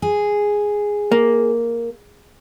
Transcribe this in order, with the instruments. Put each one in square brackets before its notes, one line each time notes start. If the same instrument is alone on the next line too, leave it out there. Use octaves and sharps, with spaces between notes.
[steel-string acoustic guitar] G#4
[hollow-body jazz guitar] A#3